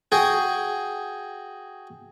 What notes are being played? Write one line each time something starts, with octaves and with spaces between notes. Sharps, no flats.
F#4 G#4 G5